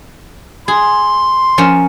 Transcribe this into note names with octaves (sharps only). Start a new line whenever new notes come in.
G#4 C6
F3 C#4 A#4